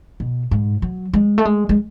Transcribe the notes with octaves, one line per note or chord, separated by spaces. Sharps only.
B2
G#2
F#3
G#3
A3
G#3
G#3